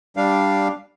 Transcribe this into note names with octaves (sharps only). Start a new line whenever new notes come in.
G3 D4 F5